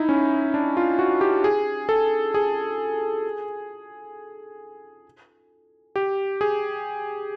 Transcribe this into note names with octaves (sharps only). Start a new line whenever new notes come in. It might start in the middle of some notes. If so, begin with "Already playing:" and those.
Already playing: D#4 E4
C#4
D4
F4
F#4
G4
G#4
A4
G#4
G4
G#4